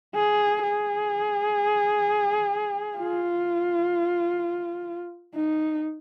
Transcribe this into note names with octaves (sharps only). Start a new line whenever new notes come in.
G#4
G#4
F4
D#4